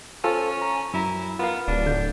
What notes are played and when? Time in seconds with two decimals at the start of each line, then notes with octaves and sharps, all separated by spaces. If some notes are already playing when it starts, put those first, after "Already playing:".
0.24 C#4 F4 A4 C5
0.62 A#5
0.94 F#2 E4 A#5
1.39 B3 F4 A#4 F5
1.68 D1 D4
1.86 D3 G6